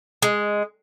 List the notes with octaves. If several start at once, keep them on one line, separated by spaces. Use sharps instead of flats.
G#3